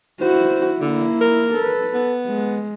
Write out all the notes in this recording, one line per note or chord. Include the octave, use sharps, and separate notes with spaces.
E4 F#4 C5
D3 A#3 E4
A#4
A4 B4
B3
G#3